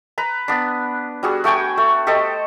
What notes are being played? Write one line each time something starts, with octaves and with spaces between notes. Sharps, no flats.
B4 A#5
B3 D4
G3 F#4 G#4
A3 F#4 G5 G#5
A3
G4 A4 C5 D#5